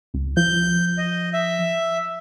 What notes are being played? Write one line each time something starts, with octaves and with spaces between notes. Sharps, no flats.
C#2
F3 G6
D#5
E5